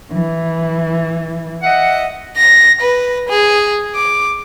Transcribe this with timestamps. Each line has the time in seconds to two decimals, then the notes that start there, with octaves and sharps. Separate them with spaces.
0.11 E3
1.62 D#5 E5 F#5
2.37 A#6
2.81 B4
3.29 G#4
3.96 D6